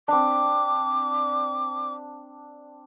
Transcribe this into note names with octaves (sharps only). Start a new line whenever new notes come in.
C4 D4 D6